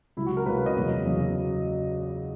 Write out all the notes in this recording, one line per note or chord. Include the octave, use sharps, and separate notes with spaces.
C#2 C#3 F#3 E4
F#4
A#4
C#2 C#3 F#3 B4
D#5
E2 C#3 F#3
E2 C#3 F#3